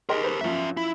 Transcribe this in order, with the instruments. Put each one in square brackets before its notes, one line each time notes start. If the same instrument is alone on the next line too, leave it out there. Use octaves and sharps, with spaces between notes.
[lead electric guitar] G4 A#4 [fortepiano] G#4 D#5 C6
[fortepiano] B4 C5
[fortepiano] F#2 F3 [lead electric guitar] C#4 E5
[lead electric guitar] E4